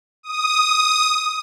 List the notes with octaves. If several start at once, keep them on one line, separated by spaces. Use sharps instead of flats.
D#6